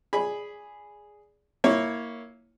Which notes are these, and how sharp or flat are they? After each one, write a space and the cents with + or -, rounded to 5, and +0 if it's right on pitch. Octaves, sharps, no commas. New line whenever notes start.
G#4 +0 D5 -15 B5 +0
A#3 +0 E4 -15 C#5 +0